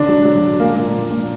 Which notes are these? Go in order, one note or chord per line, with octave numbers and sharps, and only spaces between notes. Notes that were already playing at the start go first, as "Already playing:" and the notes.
Already playing: D3 D4
F#3
F#3
D3
G#3 A#3
A#2
F3
A#2